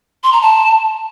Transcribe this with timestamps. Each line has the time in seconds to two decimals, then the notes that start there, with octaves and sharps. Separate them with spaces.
0.24 C6
0.33 A#5
0.42 A5